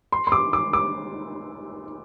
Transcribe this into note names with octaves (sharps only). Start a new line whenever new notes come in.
C6
C6
D6
D6
D6